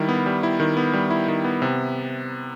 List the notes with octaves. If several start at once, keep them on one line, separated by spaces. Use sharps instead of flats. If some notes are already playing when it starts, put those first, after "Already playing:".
Already playing: D#3 G3 E4
B3
G3
E4
D#3
B3
G3
E4
D#3
B3
C3